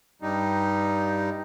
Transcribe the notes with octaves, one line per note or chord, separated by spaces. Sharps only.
G2 G3 D#4